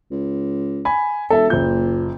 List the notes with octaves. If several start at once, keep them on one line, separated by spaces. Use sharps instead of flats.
C#2
G#5 B5
E1 A4 E5
F#1 A#2 G6